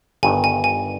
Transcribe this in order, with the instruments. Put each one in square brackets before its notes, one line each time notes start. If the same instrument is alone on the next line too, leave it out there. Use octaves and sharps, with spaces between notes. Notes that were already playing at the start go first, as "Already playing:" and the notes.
[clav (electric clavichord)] G1 G2 D#3 [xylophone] G#5
[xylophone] G#5
G#5